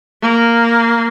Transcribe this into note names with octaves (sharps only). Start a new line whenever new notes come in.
A#3